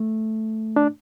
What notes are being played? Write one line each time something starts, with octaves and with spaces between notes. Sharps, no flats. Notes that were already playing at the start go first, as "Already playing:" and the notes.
Already playing: A3
D4